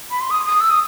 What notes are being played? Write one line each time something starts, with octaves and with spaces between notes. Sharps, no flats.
B5
C6
D#6
D#6
E6
D#6